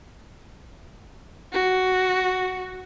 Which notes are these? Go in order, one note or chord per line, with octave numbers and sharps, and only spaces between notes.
F#4